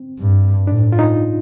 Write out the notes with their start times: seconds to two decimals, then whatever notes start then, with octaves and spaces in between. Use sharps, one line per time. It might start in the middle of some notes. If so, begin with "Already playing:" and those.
Already playing: C4
0.20 G2
0.67 A2 D4
0.92 F4
0.99 D#4